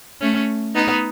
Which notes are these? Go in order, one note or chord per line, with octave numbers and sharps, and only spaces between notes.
A3 C#4
B3 D#4